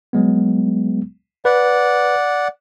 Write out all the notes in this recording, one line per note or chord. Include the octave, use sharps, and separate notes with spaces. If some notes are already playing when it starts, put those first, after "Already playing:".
F#3 G#3 B3
B4 D5 F#5